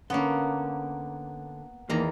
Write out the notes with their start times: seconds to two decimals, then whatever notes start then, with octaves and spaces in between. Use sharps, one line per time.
0.10 D3 A#3 B3 C#4
1.89 E2 D#3 A#3 A#5